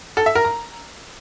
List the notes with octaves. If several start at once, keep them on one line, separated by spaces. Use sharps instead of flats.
A4
E5
A#4
A#5